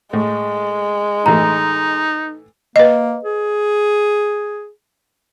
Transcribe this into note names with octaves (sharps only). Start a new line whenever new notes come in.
A2 G#3
A2 E3 A3 D#4 A#5
A#3 B4 D#5
G#4